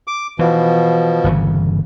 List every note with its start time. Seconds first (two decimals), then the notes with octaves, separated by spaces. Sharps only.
0.07 D6
0.39 B2 E3 F3
1.24 G1 C#3 E3